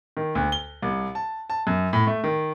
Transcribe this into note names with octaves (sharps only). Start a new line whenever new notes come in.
D#3
D2
G7
C2
A5
A5
F#2
A2
A3
D#3